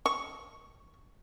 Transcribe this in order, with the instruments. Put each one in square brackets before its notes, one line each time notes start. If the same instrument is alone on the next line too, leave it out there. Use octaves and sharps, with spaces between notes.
[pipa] C#6